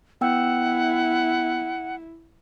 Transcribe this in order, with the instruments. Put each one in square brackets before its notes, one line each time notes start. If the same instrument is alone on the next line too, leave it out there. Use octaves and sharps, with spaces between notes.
[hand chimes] B3 G5 E6 [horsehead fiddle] E4 [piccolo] F#5